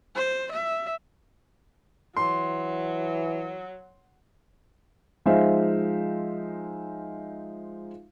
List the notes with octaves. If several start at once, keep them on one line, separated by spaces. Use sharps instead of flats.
C5
E5
E3 F#3 C6
F3 G#3 D#4 C5 E5 F5